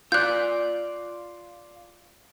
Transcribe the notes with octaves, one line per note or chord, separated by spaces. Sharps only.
F4 D5 F#6 G6